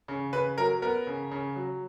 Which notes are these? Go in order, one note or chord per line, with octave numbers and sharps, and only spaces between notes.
C#3
C#3 B4
F#3 A#4
B3 A#4
C#3
C#3
F#3